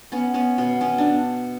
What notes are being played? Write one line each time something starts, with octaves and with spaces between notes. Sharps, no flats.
B3 C#4
B3 C#4
B2 B3
B2 C#4
D4